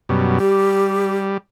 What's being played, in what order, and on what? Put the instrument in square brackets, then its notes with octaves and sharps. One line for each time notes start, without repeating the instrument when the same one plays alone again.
[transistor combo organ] F#2 B2 G3
[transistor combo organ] G3 [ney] G4